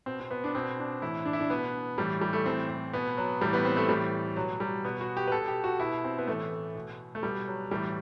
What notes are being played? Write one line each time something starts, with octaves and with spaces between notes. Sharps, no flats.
B2 C4
C4
B3
D4
B2 C4
D4
A2 E3 E4
D4
E4
D4
B2 B3
A2 E3 G3
G3
A3
A2 E3 C4
C4
B2 B3
F#3
A2 E3 G3
B3
C4
A3
A2 E3 G3
B2 F#3
G3
B2 B3
F#4
G4
B4
B2 A4
G4
F#4
B2 E4
C4
B3
A2 E3 A3
B2
A3
B2 G3
F#3
A2 E3 G3